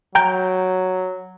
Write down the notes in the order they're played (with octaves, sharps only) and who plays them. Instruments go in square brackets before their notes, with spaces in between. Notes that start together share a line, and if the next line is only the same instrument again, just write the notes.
[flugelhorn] F#3 [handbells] G5 A#5 G6